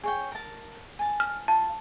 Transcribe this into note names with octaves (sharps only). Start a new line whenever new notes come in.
G#4 C#5 G5
A#4 A5
G#5 A5
F6
F4 A5